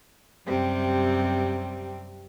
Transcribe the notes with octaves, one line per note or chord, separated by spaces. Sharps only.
F#2 C3 G3 C4